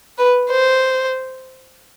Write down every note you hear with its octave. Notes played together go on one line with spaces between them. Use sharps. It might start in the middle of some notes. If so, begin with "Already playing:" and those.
B4
C5